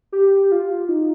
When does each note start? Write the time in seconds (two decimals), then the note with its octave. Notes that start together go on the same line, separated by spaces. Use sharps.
0.12 G4
0.52 F4
0.89 D#4